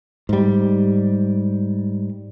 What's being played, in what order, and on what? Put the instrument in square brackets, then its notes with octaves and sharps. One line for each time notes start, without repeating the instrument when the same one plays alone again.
[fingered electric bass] G#2 G3